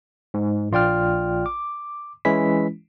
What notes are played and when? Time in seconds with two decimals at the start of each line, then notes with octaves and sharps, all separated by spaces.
0.34 G#2
0.72 A#1 F4 D5 G5 F6
1.46 D6
2.25 E3 G#3 C#4 E4 B6